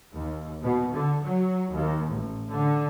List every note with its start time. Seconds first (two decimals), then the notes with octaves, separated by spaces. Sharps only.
0.13 D#2
0.63 B2
0.92 D3
1.24 F#3
1.73 D#2
2.10 A1
2.50 D3